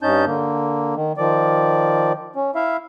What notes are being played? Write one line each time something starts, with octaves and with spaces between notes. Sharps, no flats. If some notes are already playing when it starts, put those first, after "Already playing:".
G2 C#4 D#4 A5 G6
D3 A#3
D#3
D#3 F3 D5
C#4
E4 E5 F5